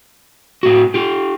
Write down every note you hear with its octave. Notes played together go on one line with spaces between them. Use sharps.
A2 F#4
F4 G4